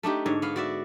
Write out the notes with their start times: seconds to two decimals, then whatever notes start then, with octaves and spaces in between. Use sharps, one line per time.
0.03 A3 D4 D#4 G4
0.26 G#2 D3 C#5
0.42 B3 F5
0.56 F#4 D5 E5